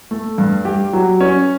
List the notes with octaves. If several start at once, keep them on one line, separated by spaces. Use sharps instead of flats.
A3
G2
G4
F#3
C#4